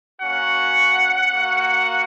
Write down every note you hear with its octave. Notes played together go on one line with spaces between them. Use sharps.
A#3 C#4 F#4 F#5
A#3 F#4